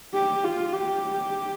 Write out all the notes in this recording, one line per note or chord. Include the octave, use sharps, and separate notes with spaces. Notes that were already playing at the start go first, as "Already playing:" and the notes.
G4
F4
G4